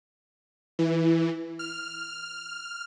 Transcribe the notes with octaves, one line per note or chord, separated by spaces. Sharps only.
E3
F6